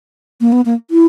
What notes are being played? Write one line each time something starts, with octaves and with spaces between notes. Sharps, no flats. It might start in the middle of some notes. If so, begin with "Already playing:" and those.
A#3
B3
A#3
E4